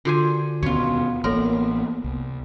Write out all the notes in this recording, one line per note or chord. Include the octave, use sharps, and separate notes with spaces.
D3 F4 F#4 C5 G#5 D6
D#2 B2 B3 C#4 F4 F#4 C#5
A1 A#3 A4 A#4 C#5 C6
C2